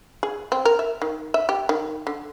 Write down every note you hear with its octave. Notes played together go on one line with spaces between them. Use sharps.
G#4
C4
A#4
E5
D#3
E5
G4
D#3
D3